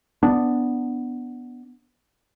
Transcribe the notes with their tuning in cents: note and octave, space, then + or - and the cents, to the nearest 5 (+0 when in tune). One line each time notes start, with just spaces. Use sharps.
B3 +0 D4 -5